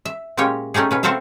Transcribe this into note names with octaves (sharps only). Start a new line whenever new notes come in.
E5
A#2 G#3 C#4 G4 C#5
A3 C#4 D#4 G4 G#4
B2 C#4 B4
C4 F#4 A4 C5 E5 F5